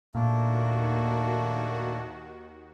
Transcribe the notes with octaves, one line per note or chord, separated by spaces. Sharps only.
D#2 A#2 D#3 A3 A#3 D4 F#4